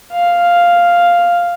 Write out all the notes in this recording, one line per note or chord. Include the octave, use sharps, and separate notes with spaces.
F5